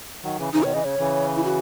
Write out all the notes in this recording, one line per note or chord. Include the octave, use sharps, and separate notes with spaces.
D#3 F#3
C#3 E3
C#3 E3 D#4
B2 D#3 C#5
C#3 E3 D#5
C#3 C#5
C#3 E3
E4
F#4